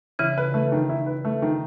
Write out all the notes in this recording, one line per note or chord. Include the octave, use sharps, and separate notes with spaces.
C#3 E3 E4
B4
A3
D#3
E4
B4
A3
D#3